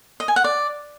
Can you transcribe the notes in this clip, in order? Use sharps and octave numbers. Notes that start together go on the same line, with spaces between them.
D#5
G#5
F#5
D5